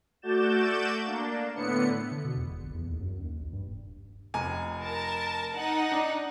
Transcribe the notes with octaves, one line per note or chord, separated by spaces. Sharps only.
A3 F#4 D5 G6 A6 E7
A#3 D4
A2 D3 B3 C#7
D3
B2
E2
E1
A#1
E2
D#2
F#2
D#2
A#1
G2
D#1
F1 G#5 A#5
A#4 A5
D#4 F#5
D4